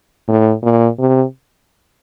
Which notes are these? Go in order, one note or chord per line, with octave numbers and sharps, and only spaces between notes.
A2
A#2
C3